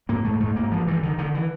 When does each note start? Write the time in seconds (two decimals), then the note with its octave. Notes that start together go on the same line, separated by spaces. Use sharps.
0.09 G#2 A#3
0.24 G#2 A3
0.40 G#2 A3
0.56 G#2 A#3
0.71 G2 F3
0.87 G2 E3
1.03 D3 D#3
1.18 D3 D#3
1.34 E3